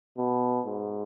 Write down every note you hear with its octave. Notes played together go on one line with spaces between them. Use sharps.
B2
G#2